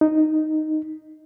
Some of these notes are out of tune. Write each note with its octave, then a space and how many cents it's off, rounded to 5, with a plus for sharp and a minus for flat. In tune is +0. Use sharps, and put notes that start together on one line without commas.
D#4 -5